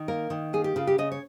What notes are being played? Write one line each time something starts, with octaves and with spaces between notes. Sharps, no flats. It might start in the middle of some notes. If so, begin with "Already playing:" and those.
Already playing: D#3
A#3 A#4
D#3
A#3 G#4
G4
C#3 F4
G4
C#3 D#5
C#5